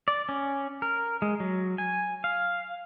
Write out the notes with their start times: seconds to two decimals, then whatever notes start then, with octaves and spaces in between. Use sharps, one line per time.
0.08 D5
0.29 C#4
0.82 A#4
1.22 G#3
1.40 F#3
1.78 G#5
2.24 F5